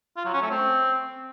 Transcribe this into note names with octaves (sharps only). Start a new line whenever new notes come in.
F4
F#3
C#4
A3
C4